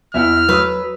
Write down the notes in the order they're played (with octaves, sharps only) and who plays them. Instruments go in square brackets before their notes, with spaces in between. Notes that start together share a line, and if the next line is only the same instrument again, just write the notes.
[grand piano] E2 E4 F#5 [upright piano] E5 [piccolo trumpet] F6
[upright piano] F#3 D#6 [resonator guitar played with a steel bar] B4 [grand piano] E6